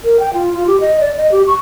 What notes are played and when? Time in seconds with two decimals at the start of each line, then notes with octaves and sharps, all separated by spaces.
0.04 A#4
0.20 G5
0.34 F4
0.53 F4
0.67 G4
0.81 D#5
1.01 D5
1.17 D#5
1.32 G4
1.47 C#6